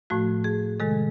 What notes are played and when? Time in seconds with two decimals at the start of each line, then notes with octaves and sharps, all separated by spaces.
0.10 A2 F3 A3 F#4
0.44 G#4
0.80 C3 D#3 G#3 A4